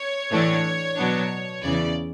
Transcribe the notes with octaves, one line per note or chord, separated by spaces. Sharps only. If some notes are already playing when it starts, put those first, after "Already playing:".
Already playing: C#5
A2 E3 A3 D4
B2 F#3 B3 D4
E2 C#3 E3 D5